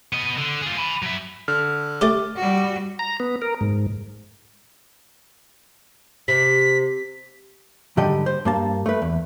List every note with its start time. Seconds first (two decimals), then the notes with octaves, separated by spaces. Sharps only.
0.13 B3 D#5
0.38 D3
0.62 F4 G#4
0.77 G#5 B5
1.02 F#3 E5
1.48 D3 F6
2.01 A3 C#4 G4 D6 A6
2.36 G3 F#4
2.99 A#5
3.20 B3
3.42 A#4
3.61 G#2
6.28 C3 B6
7.97 G#2 D3 G3 G4 D#5
8.26 C5
8.45 G2 A#3 A5
8.86 A3 B4
9.02 E2